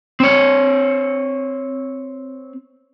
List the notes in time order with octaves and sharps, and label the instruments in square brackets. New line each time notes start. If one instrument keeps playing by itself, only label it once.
[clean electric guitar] C4 C#5